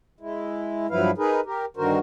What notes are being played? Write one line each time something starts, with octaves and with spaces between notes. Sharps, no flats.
G#3 E4
G2 F3 F#3 E4 B4 F5
D#4 G#4 A#4 B4
G4 A#4
G2 D3 D#3 F#4 A#4 C5